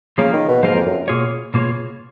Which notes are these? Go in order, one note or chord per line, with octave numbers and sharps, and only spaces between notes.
C#3 F3 A#3 F4 A#4
D#3
B2
G#2 F3 A#3 F4 A#4
F2
F#2
B2 A#3 F4 G#4 C#5
B2 A#3 F4 G#4 C#5